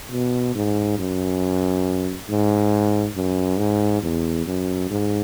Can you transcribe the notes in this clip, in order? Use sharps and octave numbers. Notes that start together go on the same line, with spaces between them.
B2
G#2
F#2
G#2
F#2
G#2
E2
F#2
G#2